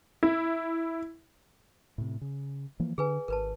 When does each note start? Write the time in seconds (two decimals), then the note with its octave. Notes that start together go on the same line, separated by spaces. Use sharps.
0.23 E4
1.98 A2 C3
2.21 C#3
2.80 E3 F3 A#3
2.98 D3 G#4 B4 G#5
3.28 G#1 A#4 B4 A5